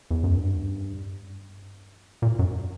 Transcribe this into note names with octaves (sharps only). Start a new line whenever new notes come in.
E2
F#2
G2
A#2
F#2